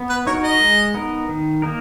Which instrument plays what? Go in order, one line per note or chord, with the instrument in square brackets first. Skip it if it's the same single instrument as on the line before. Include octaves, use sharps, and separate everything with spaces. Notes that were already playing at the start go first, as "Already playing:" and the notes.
Already playing: [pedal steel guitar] B3
[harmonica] B4
[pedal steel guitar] D#4 F#4 A#4 [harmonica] C#5
[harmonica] D#5
[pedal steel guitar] G#3
B3 D#4 A#4
D#3
A#3 D#4 A#4